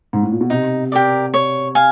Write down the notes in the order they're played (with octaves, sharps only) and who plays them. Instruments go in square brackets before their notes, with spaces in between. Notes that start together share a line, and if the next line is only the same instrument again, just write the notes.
[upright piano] G#2
A2
A#2
B2
[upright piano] C3 [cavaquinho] D#4
[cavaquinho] G4 A#4 D5
C#5
F5 G#5